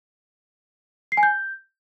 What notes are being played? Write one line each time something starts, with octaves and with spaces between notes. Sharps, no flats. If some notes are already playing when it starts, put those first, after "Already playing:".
C7
G#5
G6